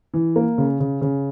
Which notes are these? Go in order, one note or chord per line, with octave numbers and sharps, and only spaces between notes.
E3
A#3
C#3
C#3
C#3